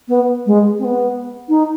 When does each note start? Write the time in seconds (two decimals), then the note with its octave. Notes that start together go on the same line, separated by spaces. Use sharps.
0.08 B3
0.46 G#3
0.79 C4
0.84 B3
1.49 D#4